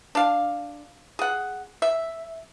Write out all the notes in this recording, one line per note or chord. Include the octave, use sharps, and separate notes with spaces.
D4 F5
G#4 F#5
E5